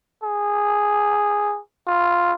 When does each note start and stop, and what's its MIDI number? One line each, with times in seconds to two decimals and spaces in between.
0.23 1.59 68
1.87 2.34 65